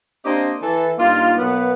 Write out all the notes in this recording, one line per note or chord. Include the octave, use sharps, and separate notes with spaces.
A#3 C4 D4 G4 C5 D#5
E3 A4
G2 A#3 D#4 F4
B2 F#3 A#3 B3 B4 F#5